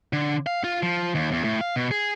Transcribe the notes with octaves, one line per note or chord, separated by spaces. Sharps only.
D3
F5
F4
F3
D#2
E2
A2
F5
B2
G#4